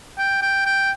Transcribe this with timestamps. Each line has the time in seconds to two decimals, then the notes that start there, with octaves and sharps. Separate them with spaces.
0.18 G5
0.42 G5
0.66 G5